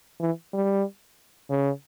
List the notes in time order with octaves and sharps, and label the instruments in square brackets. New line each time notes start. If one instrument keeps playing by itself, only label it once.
[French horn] E3
G3
C#3